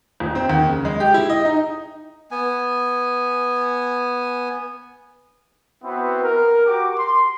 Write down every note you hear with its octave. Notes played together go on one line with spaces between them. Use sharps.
D#1
C4
D#2
C#3
G#3
G4
E4
D#5
D#4
B3 G#5
B3 C4 E4 F#4 B4
A#4
F#4 G4 D6
C6